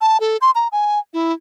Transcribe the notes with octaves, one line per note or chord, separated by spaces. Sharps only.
A5
A4
C6
A#5
G#5
E4